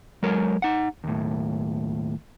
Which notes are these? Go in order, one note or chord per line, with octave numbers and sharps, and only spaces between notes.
F#3 G#3 A#4 C#5
D#4 F#5
D#2 A2